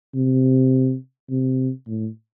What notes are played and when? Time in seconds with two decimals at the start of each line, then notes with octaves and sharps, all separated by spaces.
0.15 C3
1.30 C3
1.87 A2